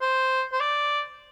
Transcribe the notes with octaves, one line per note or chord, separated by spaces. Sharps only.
C5
C5
D5